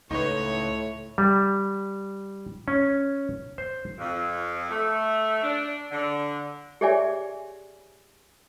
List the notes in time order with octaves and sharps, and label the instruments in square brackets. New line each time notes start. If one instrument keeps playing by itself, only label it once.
[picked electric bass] C#2 [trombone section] A2 [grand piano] D#4 B4 [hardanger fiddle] C#5
[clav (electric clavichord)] G3
C#4
C5
[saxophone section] F2
A3
D4
D3
[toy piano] G4 G#4 C#5 D5 E5 G#5